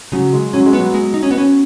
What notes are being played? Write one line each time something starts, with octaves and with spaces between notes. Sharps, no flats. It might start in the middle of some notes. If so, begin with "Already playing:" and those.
C#3 F#3
G#3
F#3 C#4
G#3
B3
F#3
G#3
D#4
C#4
B3
C#4